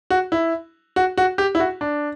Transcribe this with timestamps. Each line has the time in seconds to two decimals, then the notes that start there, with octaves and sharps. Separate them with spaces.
0.10 F#4
0.32 E4
0.96 F#4
1.18 F#4
1.38 G4
1.55 E4
1.60 F#4
1.81 D4